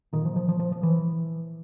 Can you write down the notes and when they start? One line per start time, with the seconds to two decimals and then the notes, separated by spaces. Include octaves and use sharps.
0.13 A#2 D#3
0.25 F3
0.36 F3
0.49 F3
0.59 F3
0.72 F3
0.83 E3